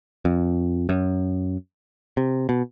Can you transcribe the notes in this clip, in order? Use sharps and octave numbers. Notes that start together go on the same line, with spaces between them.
F2
F#2
C3
B2